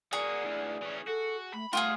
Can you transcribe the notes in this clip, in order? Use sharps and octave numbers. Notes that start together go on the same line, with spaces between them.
A#3 F#4 G#4 D5
D2 E3
E3 C#4
F#4 A4
A3 B5
G3 A3 F4 G4 G#4 F#5